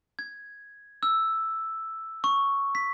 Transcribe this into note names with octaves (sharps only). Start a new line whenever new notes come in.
G#6
E6
C#6
B6